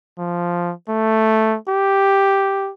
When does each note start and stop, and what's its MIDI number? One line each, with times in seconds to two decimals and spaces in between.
0.18 0.73 53
0.89 1.58 57
1.68 2.71 67